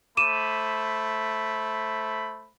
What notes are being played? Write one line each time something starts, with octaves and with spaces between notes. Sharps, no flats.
A3 C5 B5 D6 D#7 E7